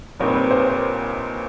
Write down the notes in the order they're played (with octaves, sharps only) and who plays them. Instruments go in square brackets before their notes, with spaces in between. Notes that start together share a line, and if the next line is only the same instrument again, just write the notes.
[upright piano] A#1 A#2 G3 C4 D#4 C#5
C5
B4
C5
C#5
C5